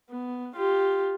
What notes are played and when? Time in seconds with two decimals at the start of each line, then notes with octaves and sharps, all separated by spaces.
0.10 B3
0.56 F4 G4